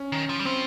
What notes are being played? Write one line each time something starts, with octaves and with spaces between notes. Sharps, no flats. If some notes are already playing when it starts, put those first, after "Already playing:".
Already playing: C#4
D#3
F3
G3
F3 C4